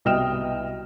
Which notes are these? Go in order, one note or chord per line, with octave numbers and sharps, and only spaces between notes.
C2 B2 D#5 G5 F6 E7